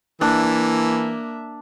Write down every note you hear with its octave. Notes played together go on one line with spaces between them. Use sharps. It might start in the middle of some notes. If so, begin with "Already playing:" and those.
E3 A#3 D4 E5